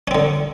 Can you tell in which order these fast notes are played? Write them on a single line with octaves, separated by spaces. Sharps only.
C#4 C4 D3